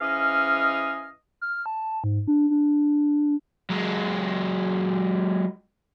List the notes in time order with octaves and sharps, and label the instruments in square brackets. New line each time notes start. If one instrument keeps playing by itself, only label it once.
[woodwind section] G#2 E3 C#4 D#5 F5 F6
[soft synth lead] F6
A5
G#2
D4
D4
[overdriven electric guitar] F#3 G#3